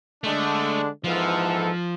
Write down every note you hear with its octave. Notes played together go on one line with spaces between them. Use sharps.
D3 G#3 A3 D4
G#2 E3 F3 B3 F4 A4